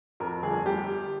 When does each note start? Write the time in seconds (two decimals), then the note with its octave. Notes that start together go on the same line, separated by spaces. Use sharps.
0.20 F2 A#4
0.43 G1 G#4
0.66 G3 G4